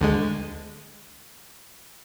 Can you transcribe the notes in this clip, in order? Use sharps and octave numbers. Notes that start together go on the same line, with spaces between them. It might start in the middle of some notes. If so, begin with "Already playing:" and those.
D2 D3 G#3